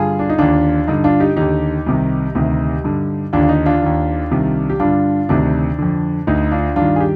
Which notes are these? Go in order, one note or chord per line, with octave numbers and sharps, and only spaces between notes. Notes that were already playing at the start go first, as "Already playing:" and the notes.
Already playing: G2 D3 F4 G#4
D4
D#4
D#2 D3 D4 F4
G2 D3 D#4
D4 F4
D#4 G4
D#2 D3 D#4 G4
C2 C3 D#3
D2 C3 D#3
G2 D3
D#2 D3 D4 F4
F4
D#4
D4 F4
D#2 D#3
C2 C3 D#3
G4
G2 D3 D4 F4
D2 C3 D#3 D4
F2 D3
D2 D3 D#4
D4 F4
G2 D#3 D4 F4
G#4
G4